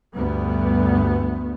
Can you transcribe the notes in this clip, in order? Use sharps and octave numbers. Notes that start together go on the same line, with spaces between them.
D2 G2 B3